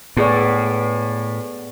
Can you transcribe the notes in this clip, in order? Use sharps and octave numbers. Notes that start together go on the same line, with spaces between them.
A2 B3 G#4 D5